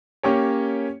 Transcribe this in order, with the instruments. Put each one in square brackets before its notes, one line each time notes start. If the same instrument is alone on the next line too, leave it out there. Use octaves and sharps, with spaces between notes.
[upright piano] A#3 C#4 G4 C#5